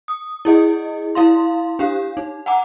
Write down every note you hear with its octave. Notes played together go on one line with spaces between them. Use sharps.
D#6
E4 G#4 D#5
E4 F5 C6
D4 G4 F5
D#4
F#5 G#5 A#5 D6